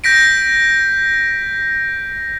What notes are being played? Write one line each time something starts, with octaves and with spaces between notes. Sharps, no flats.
G6 A#6 B6 D7